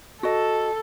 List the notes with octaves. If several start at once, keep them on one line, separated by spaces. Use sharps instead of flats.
F#4 A4 D#5